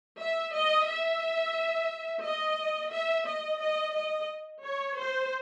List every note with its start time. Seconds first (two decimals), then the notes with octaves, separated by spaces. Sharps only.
0.21 E5
0.54 D#5
0.89 E5
2.24 D#5
2.93 E5
3.26 D#5
3.61 D#5
3.95 D#5
4.63 C#5
4.98 C5